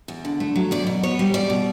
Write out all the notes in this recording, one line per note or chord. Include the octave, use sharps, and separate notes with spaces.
E2
D3
A3
F#3
E2 D5
B2
B3 C#5
G3
E2 D5
B2